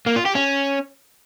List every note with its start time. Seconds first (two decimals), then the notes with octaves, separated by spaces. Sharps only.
0.07 A#3
0.16 F4
0.26 G4
0.35 C#4